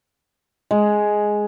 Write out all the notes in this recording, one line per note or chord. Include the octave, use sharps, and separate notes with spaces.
G#3